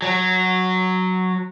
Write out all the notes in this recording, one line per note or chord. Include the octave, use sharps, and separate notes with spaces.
F#3